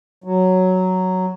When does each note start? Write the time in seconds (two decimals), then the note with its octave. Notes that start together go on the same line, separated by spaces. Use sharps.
0.24 F#3